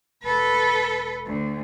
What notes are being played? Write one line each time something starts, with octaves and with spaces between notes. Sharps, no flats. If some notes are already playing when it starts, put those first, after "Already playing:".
E1 A4 B4
D2